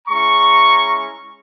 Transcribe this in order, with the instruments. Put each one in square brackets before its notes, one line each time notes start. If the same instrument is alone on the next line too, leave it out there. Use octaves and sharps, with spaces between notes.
[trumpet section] G#3 C#4 E4 A#5 C#6